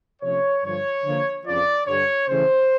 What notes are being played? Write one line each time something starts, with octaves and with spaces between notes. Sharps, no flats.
C3 F3 A3 C#4 C#5
G2 D3 F3 C#5
D3 F3 A#3
F2 C#3 F3 D5
G2 D3 G3 C#5
C#3 E3 A3 C#4 C5